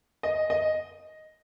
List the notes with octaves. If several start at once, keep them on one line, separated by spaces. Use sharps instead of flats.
D#5
D#5